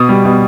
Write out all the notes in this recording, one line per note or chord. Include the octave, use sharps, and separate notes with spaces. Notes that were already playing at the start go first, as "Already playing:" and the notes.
Already playing: B2 D#6
G3
B2